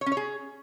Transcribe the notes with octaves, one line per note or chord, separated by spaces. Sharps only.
C#5
C#4
C#5
G#4